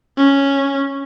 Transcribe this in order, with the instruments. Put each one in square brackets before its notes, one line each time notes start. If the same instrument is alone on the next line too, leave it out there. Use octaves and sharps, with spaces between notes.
[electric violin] C#4